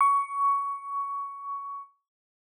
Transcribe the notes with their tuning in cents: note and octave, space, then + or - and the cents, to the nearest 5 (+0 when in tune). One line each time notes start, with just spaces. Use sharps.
C#6 +15